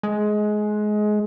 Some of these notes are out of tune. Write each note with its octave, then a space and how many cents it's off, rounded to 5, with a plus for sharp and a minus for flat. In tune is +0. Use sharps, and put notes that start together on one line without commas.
G#3 +20